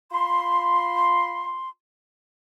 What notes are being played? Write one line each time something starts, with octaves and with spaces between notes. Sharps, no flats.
F4 B5 C6